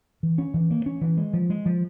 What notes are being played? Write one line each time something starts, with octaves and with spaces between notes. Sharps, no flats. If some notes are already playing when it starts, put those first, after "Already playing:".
E3
C#4
E3
A#3
C#4
E3
G#3
F3
G#3
F3